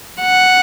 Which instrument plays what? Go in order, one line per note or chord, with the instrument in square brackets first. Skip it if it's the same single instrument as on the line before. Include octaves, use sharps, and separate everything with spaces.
[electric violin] F#5